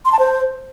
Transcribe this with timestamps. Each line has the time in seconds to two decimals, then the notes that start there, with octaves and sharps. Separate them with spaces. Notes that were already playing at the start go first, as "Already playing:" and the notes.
0.05 C6
0.12 A5
0.19 C5